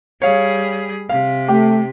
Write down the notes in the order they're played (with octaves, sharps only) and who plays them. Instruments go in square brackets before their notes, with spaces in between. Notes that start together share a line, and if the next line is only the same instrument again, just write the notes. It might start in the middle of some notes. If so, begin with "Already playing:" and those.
[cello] G3 G#4 [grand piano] C#5 F5
[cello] C3 [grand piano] F5
[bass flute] A3 [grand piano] G4